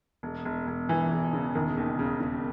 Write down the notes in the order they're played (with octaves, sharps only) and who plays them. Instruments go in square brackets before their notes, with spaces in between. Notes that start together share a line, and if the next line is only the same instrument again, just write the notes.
[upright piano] E1
E1
E1
[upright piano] E1 [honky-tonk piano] E3
[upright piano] E1
C#3
[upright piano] E1 [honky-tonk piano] D#3
[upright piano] D#2
C#3
C#3